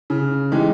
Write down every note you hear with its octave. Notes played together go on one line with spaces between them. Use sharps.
C#3
E3 G#3 D#4 G4